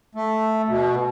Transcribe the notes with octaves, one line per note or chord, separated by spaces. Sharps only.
A3
B2